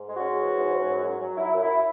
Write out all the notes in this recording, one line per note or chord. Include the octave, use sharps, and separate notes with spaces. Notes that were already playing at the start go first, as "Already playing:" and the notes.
Already playing: G#2
G#3
C#4 F#4
G#3
E3
G#2
G#2
F#2
F#3
F#3
F#3 E4
F#2
E4